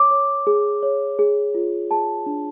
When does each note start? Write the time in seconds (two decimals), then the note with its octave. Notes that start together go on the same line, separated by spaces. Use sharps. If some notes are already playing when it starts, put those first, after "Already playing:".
Already playing: C#5 D6
0.11 C#5
0.47 G#4
0.83 C#5
1.19 G#4
1.55 F4
1.91 G#4 A5
2.26 D4